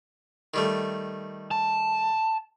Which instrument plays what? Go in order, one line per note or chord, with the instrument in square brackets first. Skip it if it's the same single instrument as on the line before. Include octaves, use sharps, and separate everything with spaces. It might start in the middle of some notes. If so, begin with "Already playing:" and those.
[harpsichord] D#3 G3 A3
[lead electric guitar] A5